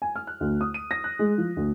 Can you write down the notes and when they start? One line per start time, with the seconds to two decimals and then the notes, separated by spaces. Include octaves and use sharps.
0.02 G#5
0.16 F6
0.27 F#6
0.40 D2
0.61 D#6
0.74 D#7
0.91 A#6
1.04 F#6
1.19 G#3
1.38 F3
1.57 D2